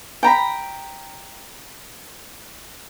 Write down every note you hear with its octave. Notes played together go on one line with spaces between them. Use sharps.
G5 A#5 B5